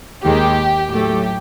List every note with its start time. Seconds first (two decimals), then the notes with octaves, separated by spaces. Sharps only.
0.23 D#2 D#3 G#3 G4
0.90 A2 F#3 A3 G4